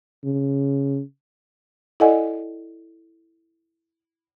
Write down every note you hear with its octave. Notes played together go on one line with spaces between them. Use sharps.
C#3
E4 A4 D5 D#5 F#5 G#5